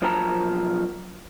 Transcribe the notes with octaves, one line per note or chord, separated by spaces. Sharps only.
B1 F3 F#4 A#4 A5 A#5